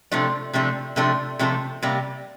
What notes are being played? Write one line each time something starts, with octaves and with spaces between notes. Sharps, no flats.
C3 F3 A3 D4 A4
C3 F3 A3 D4 A4
C3 F3 A3 D4 A4
C3 F3 A3 D4 A4
C3 G3 A#3